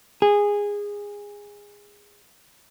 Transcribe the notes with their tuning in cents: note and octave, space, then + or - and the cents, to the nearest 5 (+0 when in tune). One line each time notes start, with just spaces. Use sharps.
G#4 -15